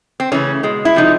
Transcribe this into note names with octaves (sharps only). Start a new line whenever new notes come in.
C4
C#3 E3 A3 C#4
B2 G#3
E4
C3 F3 G#3 D#4